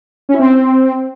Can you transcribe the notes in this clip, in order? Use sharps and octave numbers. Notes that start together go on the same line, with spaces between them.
C#4
E4
C4